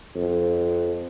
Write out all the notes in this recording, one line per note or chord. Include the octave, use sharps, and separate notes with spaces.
F2